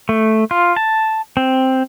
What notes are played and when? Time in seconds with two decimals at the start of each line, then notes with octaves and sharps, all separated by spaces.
0.09 A3
0.51 F4
0.76 A5
1.37 C4